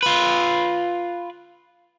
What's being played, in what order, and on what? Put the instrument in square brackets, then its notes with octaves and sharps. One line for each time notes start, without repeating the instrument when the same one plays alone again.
[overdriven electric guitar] F4 B4